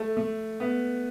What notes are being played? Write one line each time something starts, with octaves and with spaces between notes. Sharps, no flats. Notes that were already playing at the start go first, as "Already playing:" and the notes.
Already playing: A3
A3
B3